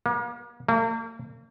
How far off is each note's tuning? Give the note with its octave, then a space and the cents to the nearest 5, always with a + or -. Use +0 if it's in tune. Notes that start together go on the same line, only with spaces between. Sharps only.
A#3 +40
A#3 -40